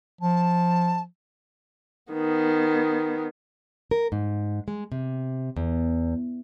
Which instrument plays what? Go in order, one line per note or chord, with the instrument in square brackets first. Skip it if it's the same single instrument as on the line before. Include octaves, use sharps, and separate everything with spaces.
[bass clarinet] F3 [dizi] A5
[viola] D#3 B3
[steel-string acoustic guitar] A#4
G#2
G#3
C3
E2